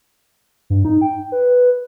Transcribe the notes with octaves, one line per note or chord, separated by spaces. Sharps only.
G2
D#4
G5
B4